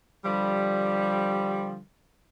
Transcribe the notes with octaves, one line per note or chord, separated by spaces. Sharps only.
D3 F3 G3